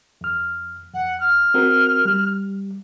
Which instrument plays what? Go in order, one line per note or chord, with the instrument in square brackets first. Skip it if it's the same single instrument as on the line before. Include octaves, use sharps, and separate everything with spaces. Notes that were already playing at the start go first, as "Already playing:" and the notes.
[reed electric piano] F2 F6
[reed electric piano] F2 [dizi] F#5
[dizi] F6
[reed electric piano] C4 F#4 A#4
G3